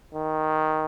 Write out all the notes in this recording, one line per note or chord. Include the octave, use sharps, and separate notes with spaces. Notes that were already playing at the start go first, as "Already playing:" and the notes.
D#3